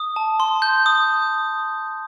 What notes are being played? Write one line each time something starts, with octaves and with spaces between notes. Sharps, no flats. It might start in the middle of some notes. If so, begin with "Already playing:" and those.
Already playing: D#6
A5
C6
G6
D#6